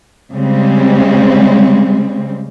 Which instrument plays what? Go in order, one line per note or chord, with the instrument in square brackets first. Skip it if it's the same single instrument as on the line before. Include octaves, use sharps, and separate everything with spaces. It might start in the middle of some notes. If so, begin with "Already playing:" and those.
[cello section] C#3 G3 G#3 C4